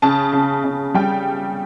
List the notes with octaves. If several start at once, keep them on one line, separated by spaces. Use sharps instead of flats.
C#3 A5
C#3
C#3
G3 G5